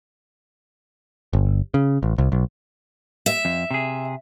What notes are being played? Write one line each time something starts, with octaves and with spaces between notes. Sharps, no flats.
G1
C#3
A1
C2
B1
E5
F2
C3 G#4